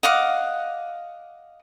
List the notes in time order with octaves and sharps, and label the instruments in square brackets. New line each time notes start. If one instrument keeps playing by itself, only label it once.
[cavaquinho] D#5 F5 F#5 D6